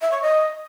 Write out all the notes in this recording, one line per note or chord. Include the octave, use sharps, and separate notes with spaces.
E5
C#5
D#5